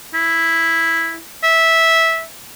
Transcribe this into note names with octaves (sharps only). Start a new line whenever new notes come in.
E4
E5